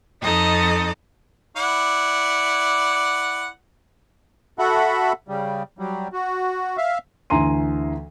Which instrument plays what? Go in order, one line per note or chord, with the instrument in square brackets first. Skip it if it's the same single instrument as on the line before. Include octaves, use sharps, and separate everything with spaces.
[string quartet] F2 D#4 A4 D#5
[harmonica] E4 D5 F#5
[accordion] F#4 A4 E5 F#5 B5
C#3 G3
F#3 G3
F#4
E5 F5
[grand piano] D2 E3 G#5 A#5 C6 D#7